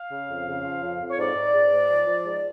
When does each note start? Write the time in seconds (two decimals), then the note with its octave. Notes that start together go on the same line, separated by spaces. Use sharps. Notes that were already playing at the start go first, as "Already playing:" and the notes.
Already playing: F5
0.12 C#3
0.30 F2
0.47 C#3
0.64 F3
0.82 F2
1.00 F2
1.11 C#5
1.18 G#2 D5
1.35 G#2
1.54 G#2
1.71 G#2
1.89 F3
2.07 F3
2.24 G#2